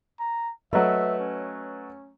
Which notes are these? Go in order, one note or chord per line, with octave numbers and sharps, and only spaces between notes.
A#5
F#3 A3 B4 D#5 E5
C#4